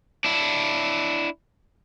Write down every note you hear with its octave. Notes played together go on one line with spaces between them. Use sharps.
D4 E4